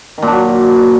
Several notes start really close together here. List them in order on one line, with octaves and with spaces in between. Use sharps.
D#3 A#2 D4 F#3